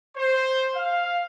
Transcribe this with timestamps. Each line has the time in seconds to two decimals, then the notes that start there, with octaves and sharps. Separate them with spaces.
0.17 C5
0.76 F5